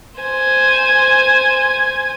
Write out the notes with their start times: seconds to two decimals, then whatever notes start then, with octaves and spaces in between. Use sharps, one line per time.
0.20 C5 G#5